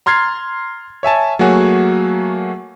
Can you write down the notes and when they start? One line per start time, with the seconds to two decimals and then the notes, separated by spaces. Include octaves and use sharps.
0.06 A#5 C6 F6 G#6 A6 C7
1.03 C#5 E5 G#5 A5
1.39 F#3 A3 A#3 F#4 G#4 C#5